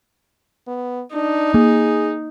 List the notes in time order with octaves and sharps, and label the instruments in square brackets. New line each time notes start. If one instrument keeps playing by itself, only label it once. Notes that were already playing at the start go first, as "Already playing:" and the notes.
[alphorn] B3
[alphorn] D4 [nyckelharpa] D#4
[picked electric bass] A#3 [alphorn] G#4